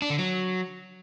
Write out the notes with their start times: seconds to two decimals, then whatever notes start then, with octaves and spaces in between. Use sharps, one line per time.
0.02 D4
0.10 D3
0.18 F#3